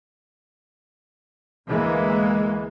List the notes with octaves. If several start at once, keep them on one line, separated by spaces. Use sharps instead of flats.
D2 E3 G#3 A#3